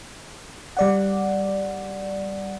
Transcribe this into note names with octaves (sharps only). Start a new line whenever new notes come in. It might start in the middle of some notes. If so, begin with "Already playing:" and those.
G3 D5 F#5